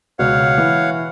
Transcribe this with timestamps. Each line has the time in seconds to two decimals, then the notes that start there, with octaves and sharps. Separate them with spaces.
0.19 C#2 B2 C#5 F5 F#5
0.58 E3